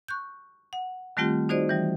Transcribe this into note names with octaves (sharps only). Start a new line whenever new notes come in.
C#6 F#6 G6
F#5
D#3 G3 A3 C4 F4 G4
D#4 F#4 G#4 C5 D5 D#5
E3 G3